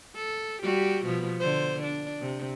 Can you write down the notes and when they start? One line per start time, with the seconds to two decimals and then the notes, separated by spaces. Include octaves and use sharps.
0.15 A4
0.63 G3 F#4 G4
1.05 B2 F3 B3
1.40 D3 C5
1.83 D4
2.21 C3